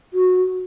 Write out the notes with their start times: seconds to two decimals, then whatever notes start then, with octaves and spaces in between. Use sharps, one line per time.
0.14 F#4